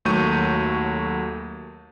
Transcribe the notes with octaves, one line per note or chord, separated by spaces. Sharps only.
D#2 F#3 A3 C#6 G6 D#7